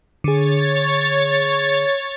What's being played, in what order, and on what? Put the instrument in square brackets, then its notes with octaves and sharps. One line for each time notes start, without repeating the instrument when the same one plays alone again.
[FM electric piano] D3 G#4 [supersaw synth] C#5 A6